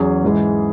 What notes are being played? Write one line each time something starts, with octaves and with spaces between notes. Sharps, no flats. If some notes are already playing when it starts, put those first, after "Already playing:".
Already playing: E2 F#3 C#4 G#4
G#2 E3 G#3